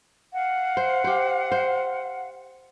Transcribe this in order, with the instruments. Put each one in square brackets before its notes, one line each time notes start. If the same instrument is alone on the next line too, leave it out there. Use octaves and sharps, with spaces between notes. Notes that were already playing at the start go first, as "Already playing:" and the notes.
[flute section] F5 F#5
[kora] C5
G4 C5
C5